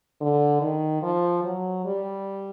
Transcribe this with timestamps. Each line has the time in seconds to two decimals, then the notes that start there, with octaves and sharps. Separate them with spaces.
0.21 D3
0.62 D#3
1.03 F3
1.44 F#3
1.85 G3